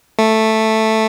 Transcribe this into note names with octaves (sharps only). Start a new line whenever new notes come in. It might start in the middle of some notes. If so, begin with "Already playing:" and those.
A3